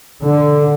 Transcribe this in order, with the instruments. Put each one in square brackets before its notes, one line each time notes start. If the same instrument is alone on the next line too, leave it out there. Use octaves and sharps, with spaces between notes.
[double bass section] D3